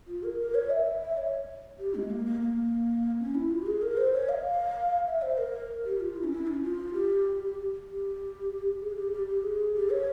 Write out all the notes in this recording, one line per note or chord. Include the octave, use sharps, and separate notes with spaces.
F4
A#4
A#4
C#5
E5
E5
C#5
G4
G#3
A#3
A#3
A#3
C#4
E4
F4
G4
G#4
A#4
C5
C#5
F5
E5
C5
A#4
G4
F4
E4
C#4
E4
C#4
F4
G4
G4
G#4
G4
G4
G4
G#4
G4
C#5